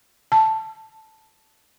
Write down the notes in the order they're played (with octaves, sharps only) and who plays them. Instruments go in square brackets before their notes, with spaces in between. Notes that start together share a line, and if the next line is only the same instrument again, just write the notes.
[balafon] A5